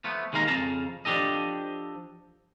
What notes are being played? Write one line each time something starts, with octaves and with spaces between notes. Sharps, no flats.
F3 A3 B3
D#2 G#3 A#3 F5 A#5
F2 C#3 F5 A5 A#5
F3 D4 G4 A4 D#5